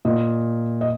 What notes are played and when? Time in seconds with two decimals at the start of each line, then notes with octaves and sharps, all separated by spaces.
0.05 A#2 D#5
0.81 D#5